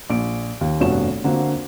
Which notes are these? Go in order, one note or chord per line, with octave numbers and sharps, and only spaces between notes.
A#1 D7
D#2
F1 G2 B3 F#4 C#5 E7
D3 A#3 C4 F#4